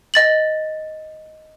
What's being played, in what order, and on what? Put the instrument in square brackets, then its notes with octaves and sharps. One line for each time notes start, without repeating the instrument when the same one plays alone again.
[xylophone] D#5 A6 F#7